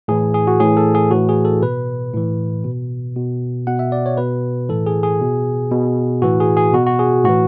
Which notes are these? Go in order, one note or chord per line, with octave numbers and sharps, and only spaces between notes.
A2 E3 G#4
G#4
F#4
A2 E3 G#4
A4
G#4
A2 E3 F#4
G#4
A4
B2 B4
A2 E3
B2
B2
B2 F#5
E5
D5
C#5
B2 B4
A2 E3 A4
G#4
G#4
B2
B2
A2 E3 F#4
G#4
G#4
B2 F#4
F#4
G#4
A2 E3 F#4